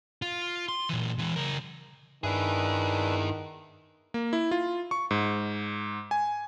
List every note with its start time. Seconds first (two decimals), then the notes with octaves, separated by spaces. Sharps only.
0.22 F4
0.68 C6
0.89 A#2 E3
1.19 E3 G#3
1.36 C#3 A#4
2.24 G2 D#3 D4 E4 G#4 B4 E5
4.14 A#3
4.33 E4
4.51 F4
4.91 C#6
5.11 G#2
6.11 G#5